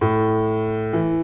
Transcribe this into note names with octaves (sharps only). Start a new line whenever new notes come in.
A2
E3